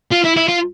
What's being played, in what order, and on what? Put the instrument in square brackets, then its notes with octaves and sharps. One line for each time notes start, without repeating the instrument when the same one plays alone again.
[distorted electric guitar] F4
E4
E4
F4